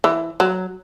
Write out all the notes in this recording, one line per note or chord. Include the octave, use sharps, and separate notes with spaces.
E3
F#3